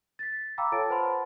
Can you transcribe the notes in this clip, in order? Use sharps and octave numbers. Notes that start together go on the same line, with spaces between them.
A6 B6
F5 G5 A#5 B5 D6 E6
F4 A4 C#5 A5 A6 D7
B4 C5 F#5 A5 B5 C6